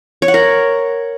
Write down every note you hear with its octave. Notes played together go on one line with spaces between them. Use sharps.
C#5
F#5
A#4